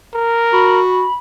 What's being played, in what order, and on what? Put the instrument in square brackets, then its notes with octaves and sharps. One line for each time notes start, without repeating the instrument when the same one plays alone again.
[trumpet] A#4
[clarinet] F#4 [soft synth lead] B5